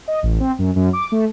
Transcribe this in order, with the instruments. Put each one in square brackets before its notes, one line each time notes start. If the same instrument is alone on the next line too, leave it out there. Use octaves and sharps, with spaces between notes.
[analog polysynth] D#5
A1
C4
F#2
F#2
D6
A3